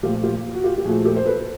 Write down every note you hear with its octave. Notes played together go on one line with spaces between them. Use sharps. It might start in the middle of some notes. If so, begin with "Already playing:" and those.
A#2 F3 A3 F4 G4
F4 G4
F#4
F4 G4
G4
A#2 F3 A3 F#4 G#4
G4 A4
C5
A4 B4